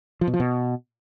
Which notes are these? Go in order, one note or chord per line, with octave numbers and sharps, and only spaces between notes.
F3
B2
F3
B2